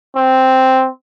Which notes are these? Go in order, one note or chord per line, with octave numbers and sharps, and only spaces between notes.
C4